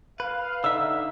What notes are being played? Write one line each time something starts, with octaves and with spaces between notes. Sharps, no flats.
B4 F5
D3 D#4 E5 E6